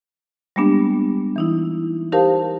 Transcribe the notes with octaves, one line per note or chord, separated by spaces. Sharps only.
G3 G#3 A#3 B3 D4 G4
E3 D#4 E4
D#4 G4 A#4 C5 F5 A5